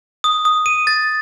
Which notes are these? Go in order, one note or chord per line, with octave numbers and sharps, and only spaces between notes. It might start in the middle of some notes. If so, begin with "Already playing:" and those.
D#6
D#6
D#7
A6